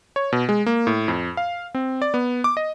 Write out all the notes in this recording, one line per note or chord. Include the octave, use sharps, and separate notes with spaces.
C#5
B2
G#3
A#3
A2
F2
F5
C4
D5
B3
D6
D#5